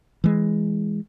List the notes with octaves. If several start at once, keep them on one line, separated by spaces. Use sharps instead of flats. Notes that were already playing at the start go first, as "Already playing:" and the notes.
E3 G#3